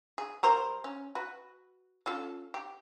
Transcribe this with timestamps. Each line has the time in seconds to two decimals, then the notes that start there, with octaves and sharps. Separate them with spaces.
0.18 G#4
0.43 G3 A#4 C5
0.84 C#4
1.15 F#4 B4
2.06 C#4 F4 A4
2.54 G4